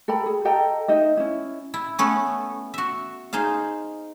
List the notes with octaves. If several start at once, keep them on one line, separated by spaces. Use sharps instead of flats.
A4 A#4 G5 B5
G#4
A4 D#5 G5 A#5
D#4 D#5 E5
C#4 E4
E4
A3 B3 C#4
F#4 E5
D#4 G#4 C5 F5